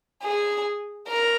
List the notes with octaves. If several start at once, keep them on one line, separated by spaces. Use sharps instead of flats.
G#4
A#4